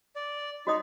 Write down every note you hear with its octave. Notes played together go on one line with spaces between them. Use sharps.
D5
D#4 F#4 D#5 D#6